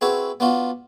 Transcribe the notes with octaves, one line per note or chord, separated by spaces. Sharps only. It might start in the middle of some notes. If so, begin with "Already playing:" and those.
C4 E4 F#4 G#4 B4 C#5
B3 D4 F4 F#4